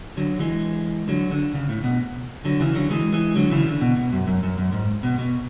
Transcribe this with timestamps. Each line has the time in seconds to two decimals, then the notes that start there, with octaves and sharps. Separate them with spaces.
0.17 D3 F#3
0.40 E3 G#3
1.08 D3 F#3
1.31 D3
1.54 C#3
1.69 A2
1.84 B2
2.45 D3 F#3
2.60 C#3 E3
2.75 D3 F#3
2.90 E3 G#3
3.13 E3 G#3
3.36 D3 F#3
3.51 C#3 E3
3.67 D3
3.81 B2
3.96 B2
4.12 F#2
4.27 F#2
4.43 F#2
4.58 F#2
4.72 G#2
5.03 B2
5.18 B2